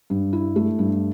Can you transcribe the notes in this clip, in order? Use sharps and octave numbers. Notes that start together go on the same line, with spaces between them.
G2
E4
A3
G2